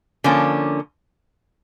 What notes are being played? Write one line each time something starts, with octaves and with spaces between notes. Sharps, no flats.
D3 F3 A#3 C#4